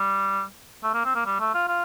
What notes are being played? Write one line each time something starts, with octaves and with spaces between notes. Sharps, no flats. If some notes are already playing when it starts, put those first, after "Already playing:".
Already playing: G3
A3
A#3
C4
A#3
G3
A3
F4
F4